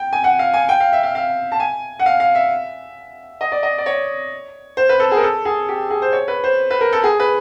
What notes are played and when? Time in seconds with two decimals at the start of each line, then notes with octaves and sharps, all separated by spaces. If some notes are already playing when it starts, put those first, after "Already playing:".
Already playing: G5
0.13 G#5
0.24 F#5
0.39 F5
0.54 G#5
0.69 G5
0.80 F5
0.93 E5
1.03 F5
1.15 F5
1.52 A5
1.60 G#5
1.99 F#5
2.06 F5
2.20 F5
2.35 E5
3.41 D#5
3.52 D5
3.63 D#5
3.78 D5
3.86 C#5
4.77 C5
4.89 B4
5.00 A4
5.11 G#4
5.17 A#4
5.23 A4
5.45 G#4
5.69 G4
5.91 G#4
6.02 C5
6.13 C#5
6.28 B4
6.44 C5
6.71 B4
6.81 A#4
6.93 A4
7.04 G#4
7.20 B4